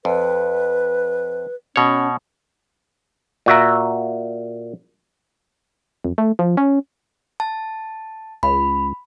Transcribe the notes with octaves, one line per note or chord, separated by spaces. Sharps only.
F2 B4
B2 C#4 C#5
A#2 F#4 E5 A#5
F2
A3
F3
C#4
A5
C#2 B5